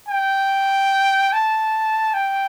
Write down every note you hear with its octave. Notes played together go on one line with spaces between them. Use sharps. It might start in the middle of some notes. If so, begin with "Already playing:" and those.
G5
A5
G5